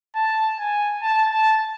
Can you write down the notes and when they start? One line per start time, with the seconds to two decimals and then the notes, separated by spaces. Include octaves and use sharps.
0.15 A5
0.59 G#5
1.02 A5
1.31 A5